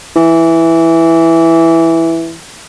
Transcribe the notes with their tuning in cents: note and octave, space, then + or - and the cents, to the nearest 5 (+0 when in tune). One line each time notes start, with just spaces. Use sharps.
E3 +0